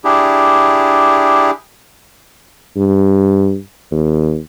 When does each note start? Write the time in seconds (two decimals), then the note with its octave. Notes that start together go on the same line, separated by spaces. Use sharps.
0.05 D4 E4 G4 G#4
2.76 G2
3.91 D#2